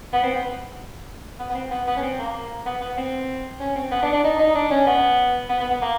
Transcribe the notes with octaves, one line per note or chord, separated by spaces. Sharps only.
B3
C4
B3
B3
B3
C4
B3
B3
C#4
C4
A#3
B3
B3
C4
C#4
C4
B3
D4
D4
D#4
D#4
D4
C#4
B3
B3
B3
B3
A#3